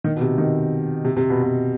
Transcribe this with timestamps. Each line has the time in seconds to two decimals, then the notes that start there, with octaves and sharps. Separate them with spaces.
0.04 D#3
0.16 B2
0.21 C3
0.38 D#3
1.05 C3
1.17 C3
1.30 B2
1.43 B2